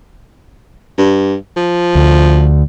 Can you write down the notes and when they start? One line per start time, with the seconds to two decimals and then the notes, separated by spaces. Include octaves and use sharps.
0.98 G2
1.57 F3
1.95 D2